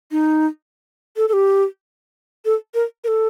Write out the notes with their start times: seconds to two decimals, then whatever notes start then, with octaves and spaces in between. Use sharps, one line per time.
0.11 D#4
1.17 A4
1.28 A4
1.33 G4
2.45 A4
2.74 A#4
3.04 A#4
3.08 A4